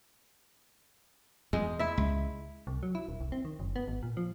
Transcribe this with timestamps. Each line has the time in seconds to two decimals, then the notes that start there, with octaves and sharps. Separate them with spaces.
1.53 E2 G#3
1.79 E4 E5
1.98 C#2
2.67 C2
2.83 F#3
2.95 E4
3.08 D#1
3.21 C2
3.32 C4
3.45 D#3
3.59 F#1
3.76 B3
3.88 G#1
4.03 A#2
4.17 F3